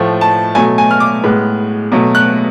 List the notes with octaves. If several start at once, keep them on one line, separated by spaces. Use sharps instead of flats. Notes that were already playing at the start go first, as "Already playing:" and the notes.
Already playing: A2 F3 A3
A5
B2 F#3 A3 G#5
G#5
F6
D6
A2 G#3 B3
B2 F#3 A3
F#6